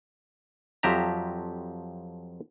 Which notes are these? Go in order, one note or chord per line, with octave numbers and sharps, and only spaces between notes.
F2 F3 F#3 G4 E5 A#5